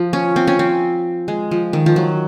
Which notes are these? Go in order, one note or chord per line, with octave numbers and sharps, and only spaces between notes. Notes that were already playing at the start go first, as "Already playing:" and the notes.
Already playing: F3
C#4
C4
C#4
C4
G#3
F3
D#3
F3
F#3